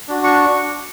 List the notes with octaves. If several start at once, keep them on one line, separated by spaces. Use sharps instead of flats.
D4 F#4
C#6